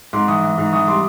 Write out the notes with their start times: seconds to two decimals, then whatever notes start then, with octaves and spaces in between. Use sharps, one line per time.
0.13 G#2 C6 D6
0.28 E3 C#6 D#6
0.43 E3
0.58 G#2
0.72 E3 C#6 D#6
0.88 G3 C6 D6